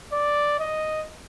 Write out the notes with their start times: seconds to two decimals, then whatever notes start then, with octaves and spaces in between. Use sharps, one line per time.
0.13 D5
0.59 D#5